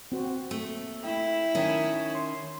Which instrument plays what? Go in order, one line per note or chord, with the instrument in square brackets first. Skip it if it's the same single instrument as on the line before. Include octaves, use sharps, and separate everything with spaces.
[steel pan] C4 F#4 C5
[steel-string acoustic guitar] A3 [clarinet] A#3
[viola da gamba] E4 [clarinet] G5
[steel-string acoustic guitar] D#3 C#4 [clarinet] C#5
[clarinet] C6